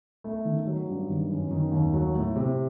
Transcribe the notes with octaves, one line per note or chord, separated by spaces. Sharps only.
A3
D#3
F#3
G2
D#3
F#2
D#3
D#2
F#3
A2
C3